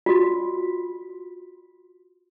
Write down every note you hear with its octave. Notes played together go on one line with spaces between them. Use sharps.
F4 F#4